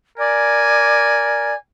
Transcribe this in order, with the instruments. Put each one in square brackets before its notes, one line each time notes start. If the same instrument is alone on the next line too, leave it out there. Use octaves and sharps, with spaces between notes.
[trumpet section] A#4 G#5 [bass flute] D5